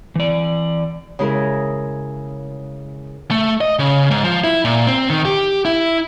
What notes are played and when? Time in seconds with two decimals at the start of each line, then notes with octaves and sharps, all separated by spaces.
0.16 E3 D5
1.19 C#3 G#3 E4 G#4 A#4
3.31 A3
3.61 D#5
3.79 C#3
4.10 G#2
4.24 F3
4.44 E4
4.65 A#2
4.87 C4
5.10 D#3
5.25 G4
5.65 E4